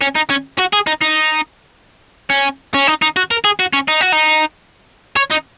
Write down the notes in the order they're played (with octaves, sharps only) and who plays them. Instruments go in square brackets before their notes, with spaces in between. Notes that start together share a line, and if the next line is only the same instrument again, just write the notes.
[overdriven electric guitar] C#4
D#4
C#4
F#4
G#4
D#4
D#4
C#4
C#4
D#4
D#4
F#4
A#4
G#4
F#4
C#4
D#4
F#4
D#4
C#5
D#4